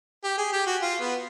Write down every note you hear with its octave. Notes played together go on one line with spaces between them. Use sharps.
G4
G#4
G4
F#4
F4
B3